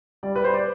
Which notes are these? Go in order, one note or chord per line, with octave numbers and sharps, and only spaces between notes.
G3 D5
B4
C5
D5